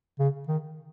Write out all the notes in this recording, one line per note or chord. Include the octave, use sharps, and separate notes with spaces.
C#3
D#3